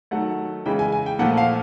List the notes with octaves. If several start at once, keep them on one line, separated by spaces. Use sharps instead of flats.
D#3 F#3 A3 F#5
C#3 E3 G#3 G5
G#5
G#5
G5
A#2 F3 A3 F#5
F5